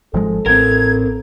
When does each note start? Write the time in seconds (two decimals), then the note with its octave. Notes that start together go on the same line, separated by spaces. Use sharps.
0.14 G#1 F3 G#3 A4
0.46 A1 C4 A#4 G#6